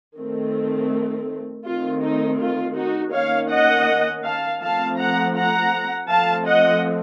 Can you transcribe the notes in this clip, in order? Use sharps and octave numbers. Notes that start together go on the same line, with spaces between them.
D#3 A3 C4
D#3 A3 C4 F4
D#4
F4
D#4 F#4
D#3 A#3 C#4 C#5 F5
D#5 F#5
F5 A5
F3 A3 C4 F5 A5
F#5 A#5
F#5 A#5
F3 A3 C4 F5 A5
D#5 F#5